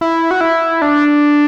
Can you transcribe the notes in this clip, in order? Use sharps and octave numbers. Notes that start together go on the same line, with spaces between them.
E4
F#4
E4
D4